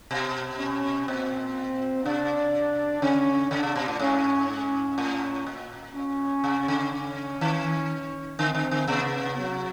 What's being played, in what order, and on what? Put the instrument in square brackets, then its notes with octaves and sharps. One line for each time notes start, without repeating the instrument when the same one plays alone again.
[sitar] B2
[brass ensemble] C#4
[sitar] A#2 [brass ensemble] C4
[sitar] C3 [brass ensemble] D4
[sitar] C#3 [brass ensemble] C#4
[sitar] C#3 [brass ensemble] D4
[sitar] C3
B2
A2
[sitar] G#2 [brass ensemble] C#4
[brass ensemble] C#4
[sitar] A2
A#2
[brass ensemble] C#4
[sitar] C3
C#3
[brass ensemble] C#4
[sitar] D#3
[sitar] D3 [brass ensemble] C4
[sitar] D3
D3
[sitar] C3 [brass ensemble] B3
[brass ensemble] F#3